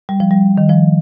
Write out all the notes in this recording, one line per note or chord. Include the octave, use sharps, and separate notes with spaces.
G3
F3
G3
D#3
F3